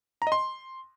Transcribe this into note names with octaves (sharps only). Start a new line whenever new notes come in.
A#5
D#5
C6